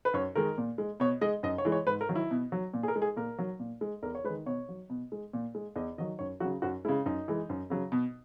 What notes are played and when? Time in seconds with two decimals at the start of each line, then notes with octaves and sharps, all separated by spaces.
0.05 B4
0.14 F#2 C#5
0.35 D#3 G#3 A#4
0.58 A#2
0.78 G#3
1.00 B2 C#5
1.21 G#3 D#5
1.43 F#2 D#5
1.58 C#5
1.65 E3 G#3
1.72 C#5
1.87 G#2 B4
2.01 A#4
2.09 D#3 F#3
2.15 E4
2.31 B2
2.52 F#3
2.74 A#2
2.83 G#4
2.88 A#4
2.96 G#3
3.02 G#4
3.16 A#2 A#4
3.38 F#3
3.60 A#2
3.81 G#3
4.03 E2 A#4
4.15 C#5
4.24 G#3 B4
4.29 D#3
4.46 B2 C#5
4.69 F#3
4.90 B2
5.12 G#3
5.33 A#2
5.55 G#3
5.76 E2 D#5
5.98 D#3 F#3 D#5
6.19 F#2 C#5
6.40 C#3 F#3 F#4
6.62 F#2 F#4
6.85 G#3 E4
6.88 C#3
7.06 F#2 D#4
7.28 E3 G#3
7.49 F#2
7.70 C#3 F#3
7.92 B2